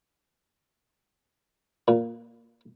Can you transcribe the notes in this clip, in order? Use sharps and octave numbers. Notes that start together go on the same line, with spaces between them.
A#2